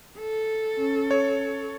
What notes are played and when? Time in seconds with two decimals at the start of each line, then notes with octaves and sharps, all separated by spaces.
0.18 A4
0.79 C#4
1.11 C#5